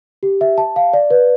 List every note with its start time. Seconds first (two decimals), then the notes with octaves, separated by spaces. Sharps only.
0.23 G4
0.41 E5
0.58 A5
0.76 F5
0.93 D5
1.11 B4